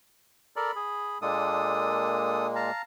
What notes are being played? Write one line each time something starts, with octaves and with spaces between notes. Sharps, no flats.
A4 A#4 D5 B5
G#4
A#2 G#3 A#3 D4 A4 D#6
F5 A5 A#5